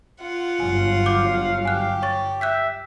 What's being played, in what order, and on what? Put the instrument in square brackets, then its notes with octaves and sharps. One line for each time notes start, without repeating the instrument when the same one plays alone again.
[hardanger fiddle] F4 F#5
[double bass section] G1 F#3 [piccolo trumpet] F5 [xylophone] G#5
[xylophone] D6 G6
[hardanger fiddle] G4 [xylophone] G#5 F#6
[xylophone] C#5 C#6 A6
[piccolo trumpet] E5 [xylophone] F#6 G6 B6